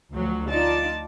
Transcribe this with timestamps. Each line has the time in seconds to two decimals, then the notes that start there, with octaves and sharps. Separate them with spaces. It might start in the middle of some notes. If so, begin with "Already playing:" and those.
0.14 D2 F3 F#3
0.49 D#4 F4 D5 A5